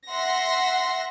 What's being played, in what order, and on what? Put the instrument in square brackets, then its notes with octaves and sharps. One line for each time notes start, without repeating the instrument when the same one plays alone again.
[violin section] E5 F#5 C6 A#6